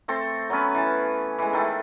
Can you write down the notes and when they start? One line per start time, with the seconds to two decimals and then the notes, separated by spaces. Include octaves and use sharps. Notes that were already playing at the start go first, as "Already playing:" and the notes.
0.08 A3 C4 A4 C5
0.50 F#3 B3 C#4 B4
0.75 E3 A5
1.38 E3 G#3
1.53 D#3 A3 A4